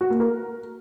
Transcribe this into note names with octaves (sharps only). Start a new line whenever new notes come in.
F#4
A#3
A#4